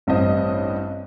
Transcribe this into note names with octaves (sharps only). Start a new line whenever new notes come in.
A1 G2 C4 G4 D#5